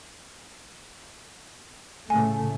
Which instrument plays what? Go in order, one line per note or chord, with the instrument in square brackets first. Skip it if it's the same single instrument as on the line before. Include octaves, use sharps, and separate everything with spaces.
[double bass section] A2 C#3 A3 [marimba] G#5